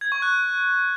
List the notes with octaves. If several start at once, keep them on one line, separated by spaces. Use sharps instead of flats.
G#6
C#6
F#6